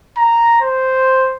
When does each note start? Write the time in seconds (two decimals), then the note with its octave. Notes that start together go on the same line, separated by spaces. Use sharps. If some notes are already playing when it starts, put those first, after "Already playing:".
0.18 A#5
0.61 C5